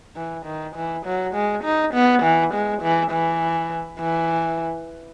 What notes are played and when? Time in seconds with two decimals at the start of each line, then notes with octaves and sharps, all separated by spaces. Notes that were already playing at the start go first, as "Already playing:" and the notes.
0.16 E3
0.46 D#3
0.76 E3
1.06 F#3
1.34 G#3
1.63 D#4
1.94 B3
2.23 E3
2.53 G#3
2.82 E3
3.12 E3
4.00 E3